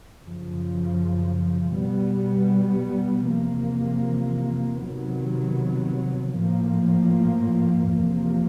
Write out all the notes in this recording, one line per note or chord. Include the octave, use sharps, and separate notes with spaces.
F#2 C#3 F3
B2 G3 B3
E2 C3 F3 A#3
C3 D#3 F#3 B3
A2 F3 A#3
E2 C3 F3 A#3